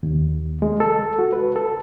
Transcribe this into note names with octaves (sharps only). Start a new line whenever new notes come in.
D#2
G#3
A4
F#4
B4
A4